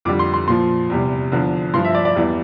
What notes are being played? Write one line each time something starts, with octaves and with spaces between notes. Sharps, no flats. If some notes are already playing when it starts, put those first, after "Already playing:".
F2 D3 G3 D6
C6
C6
A#2 F3 C6
E2 C3 G3
E2 D3 F3
G2 F3 C6
E5
D5
D5
E2 E3 G3